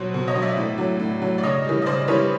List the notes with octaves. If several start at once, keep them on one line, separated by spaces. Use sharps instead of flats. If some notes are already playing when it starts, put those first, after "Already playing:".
Already playing: B2 F#3 C5
B2
C#5 D#5
F#3
D5 E5
A2
F#3
A2
F#3
D5
C#3 C#5 D#5
E3 G3
D#5
C#3 C5 D5
E3 G3 B4 C#5